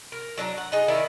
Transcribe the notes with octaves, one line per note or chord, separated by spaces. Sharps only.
A#4
F#3 D4 E5 A#5
F#5
D#4 G#4
D#3 E4 D5 E5